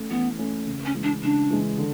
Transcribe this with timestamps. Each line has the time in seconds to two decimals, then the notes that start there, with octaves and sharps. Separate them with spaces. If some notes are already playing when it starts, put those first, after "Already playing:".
Already playing: A3 C#4
0.10 E3 B3
0.39 A3 C#4
0.67 C#3
0.85 C#4
0.94 E3 G#3
1.03 D4
1.23 C#3 D4
1.50 E3 G#3
1.78 D3